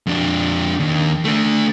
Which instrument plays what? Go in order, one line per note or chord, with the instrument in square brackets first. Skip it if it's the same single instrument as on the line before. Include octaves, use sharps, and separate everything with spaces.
[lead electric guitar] F2 D4
D#2
A3 D4